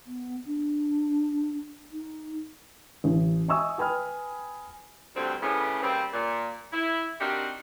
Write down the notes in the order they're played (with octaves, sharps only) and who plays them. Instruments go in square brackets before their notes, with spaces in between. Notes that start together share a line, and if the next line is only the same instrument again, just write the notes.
[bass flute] B3
D4
D#4
[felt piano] A1
D#5 E5 G#5 C#6 D#6 E6
B4 G5 G#5 B5 D#6 F6
[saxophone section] D2 G2 C4
A2 C#3 A3 B3 C#4 D4
C#3 G3 A#3 C4
A#2
E4
C4 D4 D#4 F#4 G4 A#4